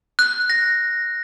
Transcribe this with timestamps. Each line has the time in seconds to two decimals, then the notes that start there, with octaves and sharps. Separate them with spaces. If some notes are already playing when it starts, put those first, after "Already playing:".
0.19 F#6
0.50 A#6